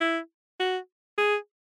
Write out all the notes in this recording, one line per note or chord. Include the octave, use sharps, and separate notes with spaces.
E4
F#4
G#4